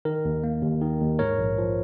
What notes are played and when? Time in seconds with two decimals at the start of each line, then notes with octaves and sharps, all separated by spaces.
0.05 D#3 A#4
0.25 D#2
0.44 A#3
0.62 D#2
0.81 D#3
1.01 D#2
1.19 G#2 A#4 C#5
1.38 A#1
1.58 F3